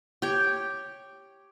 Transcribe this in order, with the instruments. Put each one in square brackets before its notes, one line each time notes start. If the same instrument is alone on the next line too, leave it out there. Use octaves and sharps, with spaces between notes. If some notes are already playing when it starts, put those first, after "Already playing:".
[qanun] G4 C#5